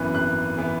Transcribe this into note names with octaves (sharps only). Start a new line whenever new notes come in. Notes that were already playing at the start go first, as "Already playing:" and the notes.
Already playing: G#1 F#2 E3 B3 F#6
G#1 F#6
E3 B3